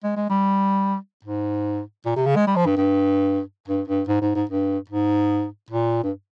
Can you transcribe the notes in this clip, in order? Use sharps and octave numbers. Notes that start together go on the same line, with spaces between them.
G#3
G#3
G3
G#2
A#2
C3
C#3
G#3
G3
F3
G2
G2
G2
G2
G#2
G#2
G#2
G2
G#2
A#2
G2